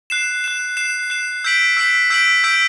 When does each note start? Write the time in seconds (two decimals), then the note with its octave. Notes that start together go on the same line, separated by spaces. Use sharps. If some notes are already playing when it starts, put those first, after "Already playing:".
0.10 F#6 C7 E7
0.44 F#6 C7 E7
0.77 F#6 C7 E7
1.10 F#6 C7 E7
1.44 E6 G6 B6 D7 F#7
1.77 E6 G6 B6 D7 F#7
2.10 E6 G6 B6 D7 F#7
2.44 E6 G6 B6 D7 F#7